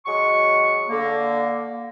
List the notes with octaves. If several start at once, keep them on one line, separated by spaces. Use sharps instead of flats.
F#3 G#3 C#6
D3 A#3